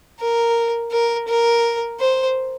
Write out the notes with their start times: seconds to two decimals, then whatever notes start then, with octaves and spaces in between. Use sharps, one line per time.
0.20 A#4
0.92 A#4
1.28 A#4
2.00 C5